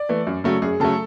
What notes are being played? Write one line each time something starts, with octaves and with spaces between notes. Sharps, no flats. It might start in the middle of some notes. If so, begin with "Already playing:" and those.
Already playing: D5
E3 A3
F#2
C#3 F#3 A3
F#2 G#4
C#3 F#3 A3 A4